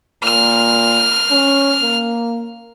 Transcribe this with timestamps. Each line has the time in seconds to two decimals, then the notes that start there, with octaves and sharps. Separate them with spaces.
0.23 A#2 F6
1.31 C#4
1.83 A#3